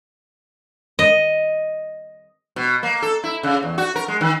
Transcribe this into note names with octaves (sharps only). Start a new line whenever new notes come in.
D#5
B2
A#3
A4
E4
C#3
E2
F#4
A#4
G#3
D#3